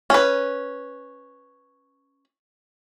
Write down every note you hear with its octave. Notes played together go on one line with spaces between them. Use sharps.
C#4 B4